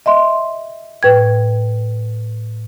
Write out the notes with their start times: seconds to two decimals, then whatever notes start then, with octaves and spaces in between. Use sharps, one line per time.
0.06 D#5 E5 C6
1.03 A2 B4 G5 G#6